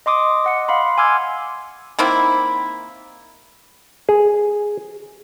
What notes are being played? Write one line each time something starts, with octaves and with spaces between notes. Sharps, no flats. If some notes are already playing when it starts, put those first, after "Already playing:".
D#5 C6 D6 D#6
D#5 F#5 C#7
F5 F#5 B5 C6
G#5 C6 D6 E6 F6 G#6
D#3 A#3 C4 E4
G#4